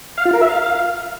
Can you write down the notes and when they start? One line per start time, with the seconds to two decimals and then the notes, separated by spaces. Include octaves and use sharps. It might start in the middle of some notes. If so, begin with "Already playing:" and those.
0.18 F5
0.25 F4
0.33 A#4
0.41 E5
0.49 F5